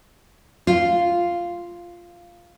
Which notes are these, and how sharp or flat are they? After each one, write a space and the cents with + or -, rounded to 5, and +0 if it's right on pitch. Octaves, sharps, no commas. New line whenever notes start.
F4 -5